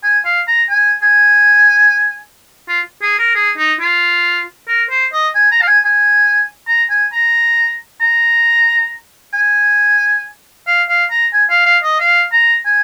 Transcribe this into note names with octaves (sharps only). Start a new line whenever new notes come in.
G#5
F5
A#5
G#5
G#5
F4
G#4
A#4
G#4
D#4
F4
A#4
C5
D#5
G#5
A#5
F5
G#5
G#5
A#5
G#5
A#5
A#5
G#5
F5
F5
A#5
G#5
F5
F5
D#5
F5
A#5
G#5